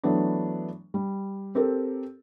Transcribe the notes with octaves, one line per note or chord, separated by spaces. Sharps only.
E3 F#3 A3 B3 D4
G3
C4 G4 A4 A#4